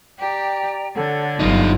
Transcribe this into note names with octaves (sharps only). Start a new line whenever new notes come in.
G4 D5 G5 A#5
D3 F#4 A4 C#5
G1 F#3 D#4 F4 D#5 F5